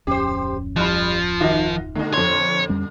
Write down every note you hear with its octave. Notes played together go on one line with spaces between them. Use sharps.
D1 F2 C#4 G4 C5
F3 G3 B5 F6 F#6
D#3 D#4 F4 F#4
A#2 D3 A3 D#4
F2 A4 C#5 C6
F2 G3 C#4